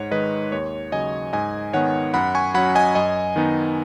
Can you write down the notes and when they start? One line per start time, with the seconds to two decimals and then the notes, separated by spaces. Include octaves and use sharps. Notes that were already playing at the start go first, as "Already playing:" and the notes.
Already playing: G#2 C#5 F#5
0.11 D#3 G#3 D#4 B4 D#5
0.52 D#2 C#5
0.92 C#3 F#3 D#5 G#5
1.33 G#2 D#5 G#5
1.73 D#3 B3 C#5 F#5
2.14 F#2 F#5 B5
2.35 G#5 C#6
2.54 F#3 C#4 F#5 B5
2.75 D#5 G#5
2.95 F#2 D#5 G#5
3.36 D#3 B3 D#4